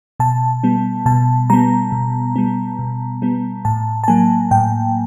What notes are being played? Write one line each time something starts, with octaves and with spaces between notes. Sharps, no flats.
B2 A5
G3 B3
B2 A5
G3 B3 A#5
B2
G3 B3
B2
G3 B3
A2 A5
A5
F#3 A#3 G#5
A2 G5